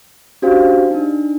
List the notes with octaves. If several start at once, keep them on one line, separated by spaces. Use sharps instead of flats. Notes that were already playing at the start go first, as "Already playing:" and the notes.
C#4 D4 F#4 G4 C5 F5
D4 D#4